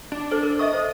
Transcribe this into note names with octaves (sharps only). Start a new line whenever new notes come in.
D4
A4 C5
A#4
D#5 E5 C#6 D#6
C5